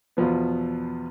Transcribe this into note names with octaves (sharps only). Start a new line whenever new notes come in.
E2 B2 F3 B3